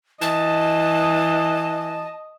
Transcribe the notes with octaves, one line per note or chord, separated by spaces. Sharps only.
E3 D#5 A5